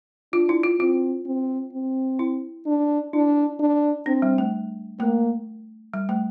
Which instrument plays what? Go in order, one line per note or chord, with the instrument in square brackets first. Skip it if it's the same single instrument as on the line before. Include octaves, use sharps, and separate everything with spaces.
[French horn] D4 [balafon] F4
[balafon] E4
F4
[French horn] C4 [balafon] F4
[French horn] C4
C4
[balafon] E4
[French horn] D4
[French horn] D4 [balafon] E4
[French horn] D4
[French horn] C4 [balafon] D4
[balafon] G3
A3
[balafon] A3 [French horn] A#3
[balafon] G3
A3